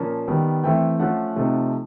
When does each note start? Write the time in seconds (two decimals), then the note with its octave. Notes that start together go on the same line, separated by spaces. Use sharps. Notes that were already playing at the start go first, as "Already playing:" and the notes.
Already playing: A#2 F3 A#3 C#4 A5
0.28 D#3 G3 B3
0.64 E3 A3 C4 E4 G5
0.99 F3 A3 C#4 F4 F#5
1.36 C3 F3 A3 C4 D#4